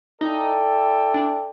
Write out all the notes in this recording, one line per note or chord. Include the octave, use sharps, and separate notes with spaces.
D#4 E4 A4 D5 G5
D4